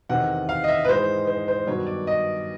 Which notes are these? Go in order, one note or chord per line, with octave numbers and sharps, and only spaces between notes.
E2 C3 D#3 F#5
F5
D#5
E5
B4
G#2 E3 G#3 C5
C5
C5
G2 D#3 F#3 B3 C#5
D5
D#5